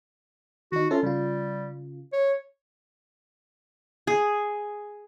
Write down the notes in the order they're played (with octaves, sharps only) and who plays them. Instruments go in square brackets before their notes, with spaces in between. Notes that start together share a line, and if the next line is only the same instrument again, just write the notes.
[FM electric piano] D#3 D#4 [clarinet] F#4
[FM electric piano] C#4 A4 E5 [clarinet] F4
[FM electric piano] C#3 F4 [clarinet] G3
[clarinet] C#5
[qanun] G#4